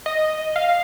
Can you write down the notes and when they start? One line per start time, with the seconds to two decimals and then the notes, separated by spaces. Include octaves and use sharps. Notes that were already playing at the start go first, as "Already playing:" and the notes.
0.06 D#5
0.56 F5